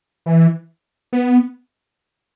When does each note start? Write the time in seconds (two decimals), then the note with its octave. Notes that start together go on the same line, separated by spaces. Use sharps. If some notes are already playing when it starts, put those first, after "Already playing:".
0.26 E3
1.13 B3